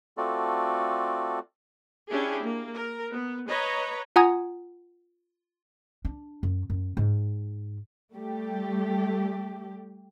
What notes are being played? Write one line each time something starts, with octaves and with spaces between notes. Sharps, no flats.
A3 C4 F4 F#4 A4 D5
C#4 D4 E4 G4 G#4
A#3
A#4
B3
B4 C#5 D#5 A#5
F4 F#5 G#5 A#5 D#6 G#6
D4
F#2
F#2
G#2
G3 A3 G4